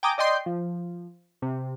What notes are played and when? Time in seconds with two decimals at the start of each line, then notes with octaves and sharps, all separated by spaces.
0.03 G5 G#5 A#5 D6 D#6
0.18 D5 D#5 G5 C6 G6
0.46 F3
1.42 C3